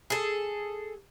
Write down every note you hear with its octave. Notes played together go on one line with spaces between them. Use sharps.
G#4 A4